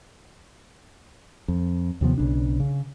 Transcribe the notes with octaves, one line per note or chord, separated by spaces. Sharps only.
F2
D#2 C3 F3 B3
B1 C#3 D4
C#3